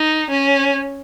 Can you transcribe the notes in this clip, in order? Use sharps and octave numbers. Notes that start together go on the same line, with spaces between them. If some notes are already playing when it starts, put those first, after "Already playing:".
Already playing: D#4
C#4